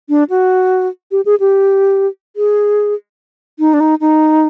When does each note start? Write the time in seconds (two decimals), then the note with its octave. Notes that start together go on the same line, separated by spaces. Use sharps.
0.09 D4
0.30 F#4
1.12 G4
1.26 G#4
1.40 G4
2.36 G#4
3.59 D#4
3.74 D4
3.80 D#4
4.01 D#4